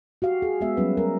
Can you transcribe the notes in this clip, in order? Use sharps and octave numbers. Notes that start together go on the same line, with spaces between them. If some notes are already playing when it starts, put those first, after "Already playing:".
F#4 G4 F5
G#4
G#3 B3 F#4 E5
F#3 G3 B3 C#4 B4
A#4